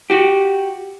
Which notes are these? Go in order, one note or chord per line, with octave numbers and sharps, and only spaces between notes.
F#4 G4